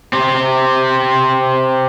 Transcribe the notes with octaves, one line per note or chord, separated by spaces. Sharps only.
C4 G4